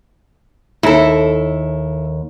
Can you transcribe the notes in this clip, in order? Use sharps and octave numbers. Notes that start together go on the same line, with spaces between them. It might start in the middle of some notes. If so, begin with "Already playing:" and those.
D#2 E4 A4